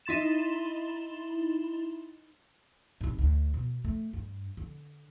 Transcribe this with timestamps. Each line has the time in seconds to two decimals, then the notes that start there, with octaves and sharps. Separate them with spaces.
0.06 D#4 E4 C6 A6 E7
3.01 G#2 C3
3.18 D2
3.54 B2
3.85 A3
4.13 G2
4.57 D3